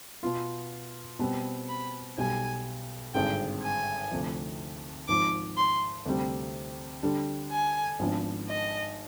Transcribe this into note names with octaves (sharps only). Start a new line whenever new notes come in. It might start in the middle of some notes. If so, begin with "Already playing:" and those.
B2 B3 F4
B2 G3 C4
B5
B1 B2 G3 G#5
G#1 G2 D3 G#3 C4 G5
G#5
D2 C3 F3
G#1 G#2 F3 D6
C6
D2 C3 G3 C4
D3 G3 D4
G#5
G#1 G#2 F3 B3 D4
D#5